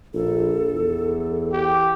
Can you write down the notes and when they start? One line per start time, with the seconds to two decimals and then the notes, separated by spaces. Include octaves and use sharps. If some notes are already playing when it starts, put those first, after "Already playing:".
0.14 A#1 A4
0.74 E2
1.52 G4